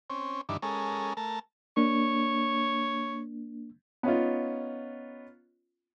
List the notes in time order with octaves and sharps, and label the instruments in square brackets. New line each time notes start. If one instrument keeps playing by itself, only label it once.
[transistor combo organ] C4 C#4
G2 D#3 E3 D4
G#3 C#4 A4 A#4
A3 A#4 A5
[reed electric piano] A#3 D4 [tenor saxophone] C#5
[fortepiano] B3 C#4 D#4 F4